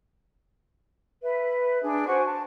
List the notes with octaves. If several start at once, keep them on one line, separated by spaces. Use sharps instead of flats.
B4 E5
D4 G#4
F#4 C5 G#5 C#6
A5